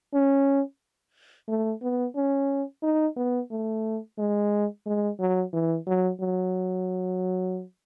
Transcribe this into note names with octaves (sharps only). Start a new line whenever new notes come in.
C#4
A3
B3
C#4
D#4
B3
A3
G#3
G#3
F#3
E3
F#3
F#3